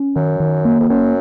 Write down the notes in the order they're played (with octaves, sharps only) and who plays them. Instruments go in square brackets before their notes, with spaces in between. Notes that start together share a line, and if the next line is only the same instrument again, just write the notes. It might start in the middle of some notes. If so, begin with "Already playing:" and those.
Already playing: [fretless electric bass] C#4
[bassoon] F#2 [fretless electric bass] D#3
[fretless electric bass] D#3
A#3
[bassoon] F2
[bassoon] F#2 [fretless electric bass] C#4